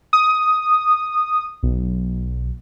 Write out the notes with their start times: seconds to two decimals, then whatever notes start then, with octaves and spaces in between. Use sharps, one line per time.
0.13 D#6
1.63 B1